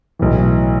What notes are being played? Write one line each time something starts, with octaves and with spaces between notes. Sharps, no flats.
B1 A2 E3